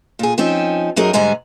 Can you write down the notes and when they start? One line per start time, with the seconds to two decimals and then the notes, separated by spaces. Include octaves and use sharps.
0.19 A#2 G#4
0.38 F3 C4 C#4 D#4
0.96 F#2 F#3 D#4 G#4 A#4
1.13 G#2 D3 G3 G#3 G#5 A#5